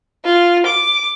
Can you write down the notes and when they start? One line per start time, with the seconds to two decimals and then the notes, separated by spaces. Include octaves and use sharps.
0.25 F4
0.67 D6